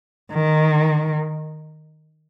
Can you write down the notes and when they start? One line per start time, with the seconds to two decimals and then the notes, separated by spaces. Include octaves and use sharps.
0.32 D#3